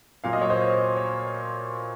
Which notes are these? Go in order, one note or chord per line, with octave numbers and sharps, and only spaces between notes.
A#2 F#3 F5
D#5
C#5
C5 D#5
C#5